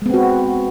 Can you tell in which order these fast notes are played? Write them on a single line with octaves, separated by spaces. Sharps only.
G#3 B3 C4 F#4